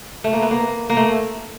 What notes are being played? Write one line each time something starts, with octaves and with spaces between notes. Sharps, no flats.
A3
A#3
B3
A#3
A#3
A3